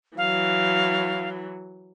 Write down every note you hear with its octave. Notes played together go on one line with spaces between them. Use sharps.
E3 F#3 F5